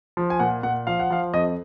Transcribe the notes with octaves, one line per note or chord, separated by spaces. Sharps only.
F3
G#5
A#2 F#5
A#2 F#5
F3 F5
F#5
F3 F5
F2 D#5